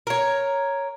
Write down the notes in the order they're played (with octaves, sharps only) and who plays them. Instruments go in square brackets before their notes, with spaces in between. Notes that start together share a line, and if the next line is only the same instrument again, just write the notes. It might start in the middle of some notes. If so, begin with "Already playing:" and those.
[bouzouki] A#4 C#5